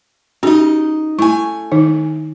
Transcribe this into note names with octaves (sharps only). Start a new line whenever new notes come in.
C#4 D#4 F#4 G4 D#5
A3 E4 G#5
D#3 D#4